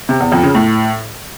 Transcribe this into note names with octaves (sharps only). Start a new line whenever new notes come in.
C3
E2
F2
C#3
A2